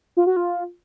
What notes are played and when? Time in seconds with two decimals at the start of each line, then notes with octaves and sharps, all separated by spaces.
0.17 F4
0.27 F#4
0.36 F4